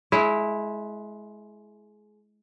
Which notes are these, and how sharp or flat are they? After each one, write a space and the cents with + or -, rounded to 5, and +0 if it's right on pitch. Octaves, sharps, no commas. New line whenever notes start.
G#3 +25 E4 +0